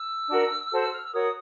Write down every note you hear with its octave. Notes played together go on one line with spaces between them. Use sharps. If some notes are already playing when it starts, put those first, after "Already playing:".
Already playing: E6
D4 F#4 A#4
F#4 A4 C5
F6
E6
F#4 A#4 C#5 D#6